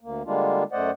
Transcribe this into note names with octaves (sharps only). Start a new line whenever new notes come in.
D2 A#3
D3 G3 G#3 A#3 D4 F4
F#2 A3 C5 D5 D#5 F#5